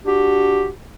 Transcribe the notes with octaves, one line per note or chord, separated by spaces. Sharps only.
D4 F#4 G4